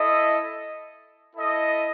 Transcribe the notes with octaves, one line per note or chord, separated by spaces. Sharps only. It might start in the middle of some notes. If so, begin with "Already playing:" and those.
Already playing: E4 A4 D#5
E4 A4 D#5